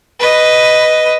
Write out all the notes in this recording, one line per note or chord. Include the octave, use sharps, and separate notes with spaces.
B4 D#5